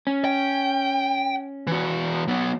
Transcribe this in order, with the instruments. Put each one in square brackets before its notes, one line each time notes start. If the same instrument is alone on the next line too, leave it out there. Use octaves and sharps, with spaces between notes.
[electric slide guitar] C#4
[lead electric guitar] G5
E3 F#4
F#3 B3